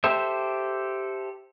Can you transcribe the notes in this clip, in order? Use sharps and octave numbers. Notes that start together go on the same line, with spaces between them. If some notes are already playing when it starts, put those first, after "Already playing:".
G4 A4 C5 E5